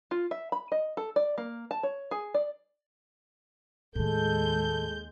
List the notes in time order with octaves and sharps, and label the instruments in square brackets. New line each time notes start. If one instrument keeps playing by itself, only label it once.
[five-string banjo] F4
E5
B5
D#5
A4
D5
A#3
A5
C#5
G#4
D5
[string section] D#2 G#3 G6 [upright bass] A2 D#3 [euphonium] A4